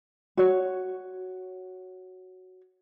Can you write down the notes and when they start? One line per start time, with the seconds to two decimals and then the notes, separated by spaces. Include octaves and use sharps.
0.37 F#4 C#5